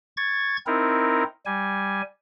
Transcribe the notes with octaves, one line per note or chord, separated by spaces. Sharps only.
C#6 G#6 A6
C4 D#4 E4 A#4
G3 G#5